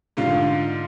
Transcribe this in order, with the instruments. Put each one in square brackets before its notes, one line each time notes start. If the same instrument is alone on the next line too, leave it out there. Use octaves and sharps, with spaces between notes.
[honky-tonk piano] G#2 D3 F4